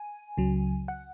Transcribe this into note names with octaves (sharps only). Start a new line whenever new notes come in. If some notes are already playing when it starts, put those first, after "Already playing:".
Already playing: G#5
C#2 C#3 F#3
F#5